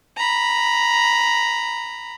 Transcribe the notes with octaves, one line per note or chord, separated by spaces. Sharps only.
A#5 B5